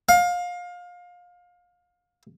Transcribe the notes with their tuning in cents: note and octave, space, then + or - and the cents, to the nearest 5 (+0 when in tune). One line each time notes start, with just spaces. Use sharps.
F5 +25